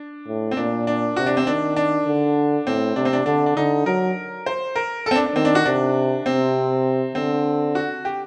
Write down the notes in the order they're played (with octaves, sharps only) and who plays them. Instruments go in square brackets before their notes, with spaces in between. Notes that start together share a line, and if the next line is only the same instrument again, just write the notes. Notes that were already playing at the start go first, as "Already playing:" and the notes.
Already playing: [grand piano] D4
[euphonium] A2
[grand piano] C4
[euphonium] A#2 [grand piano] D4
[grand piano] D4
[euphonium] C3 [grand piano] F#4
[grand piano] D4
C4
[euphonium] D#3 [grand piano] D4
[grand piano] D4
[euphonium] D3
[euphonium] A2 [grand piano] C4
[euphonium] C3 [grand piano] D4
[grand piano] C4
D4
[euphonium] D3 [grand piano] D4
[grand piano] D4
[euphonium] D3 [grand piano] D#4
[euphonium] F#3 [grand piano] A#4
[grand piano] C5
A#4
C4 A4
D4
D4
[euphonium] D#3 [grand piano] C4
[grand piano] D4
F#4
[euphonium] C3 [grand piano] D4
[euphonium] C3 [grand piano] C4
[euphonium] D3 [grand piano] C4
[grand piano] F#4
G4